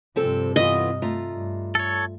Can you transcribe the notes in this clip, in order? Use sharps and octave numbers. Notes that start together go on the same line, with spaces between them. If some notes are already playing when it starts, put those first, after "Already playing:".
G2 C3 F3 C4 A4
E3 B3 F4 D#5
A3 F4 A#5
G2
A4 C#5